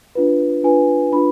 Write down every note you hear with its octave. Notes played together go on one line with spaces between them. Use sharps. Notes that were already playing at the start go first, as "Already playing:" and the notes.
D4 F4 B4
D4 F4 B4 G#5
D4 F4 B4 B5